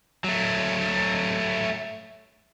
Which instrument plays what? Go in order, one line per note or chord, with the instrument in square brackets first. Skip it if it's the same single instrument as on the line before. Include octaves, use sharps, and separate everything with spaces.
[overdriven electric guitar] F#3 A3